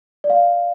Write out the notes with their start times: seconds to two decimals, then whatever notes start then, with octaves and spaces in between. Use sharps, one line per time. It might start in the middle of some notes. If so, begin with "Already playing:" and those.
0.24 D5
0.30 F5